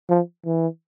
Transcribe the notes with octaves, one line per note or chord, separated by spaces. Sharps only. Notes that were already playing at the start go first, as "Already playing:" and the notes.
F3
E3